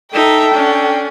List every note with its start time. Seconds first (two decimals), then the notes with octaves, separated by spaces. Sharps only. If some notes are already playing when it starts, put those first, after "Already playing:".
0.13 D#4 A4 E5 G5
0.54 C#4 D4